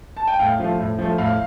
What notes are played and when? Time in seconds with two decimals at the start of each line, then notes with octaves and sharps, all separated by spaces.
0.17 A5
0.27 G5
0.39 A2 F5
0.60 F3 A3
0.79 A2
0.99 F3 A3
1.18 A2 F5